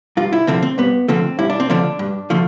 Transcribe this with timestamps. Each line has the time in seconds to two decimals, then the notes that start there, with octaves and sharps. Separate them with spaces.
0.17 G2 F4
0.33 E4
0.47 D3 F3 A3 C4
0.62 C4
0.78 G2 B3
1.08 D3 F3 A3 C4
1.39 G2 E4
1.50 D4
1.60 C4
1.70 D3 F3 A3 D4
1.99 G2
2.30 D3 F3 A3